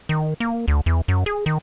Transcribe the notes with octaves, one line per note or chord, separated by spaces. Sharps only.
D#3
A#3
D2
E2
F#2
G#4
D#3